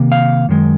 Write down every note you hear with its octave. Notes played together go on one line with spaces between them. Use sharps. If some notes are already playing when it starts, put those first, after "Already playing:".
Already playing: C3 D#3 A#3
F5
F#2 D#3 G#3